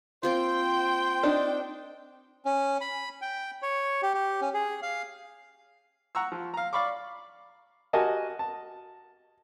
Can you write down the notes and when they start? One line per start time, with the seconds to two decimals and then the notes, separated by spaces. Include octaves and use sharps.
0.23 A#3 C4 F4 C5 G5
1.23 C4 D4 D#4
2.45 C#4
2.81 B5
3.21 G5
3.62 C#5
4.02 G4
4.14 G4
4.41 C#4
4.54 G#4
4.82 F5
6.15 F#5 A#5 C#6 E6
6.32 F3
6.54 F5 A#5
6.73 D5 F5 B5 C#6 D6
7.93 F#4 G4 A#4 D#5 G#5 A5
8.39 A5